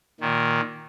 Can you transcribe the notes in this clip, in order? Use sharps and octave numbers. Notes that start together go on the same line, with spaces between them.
A#2 D#3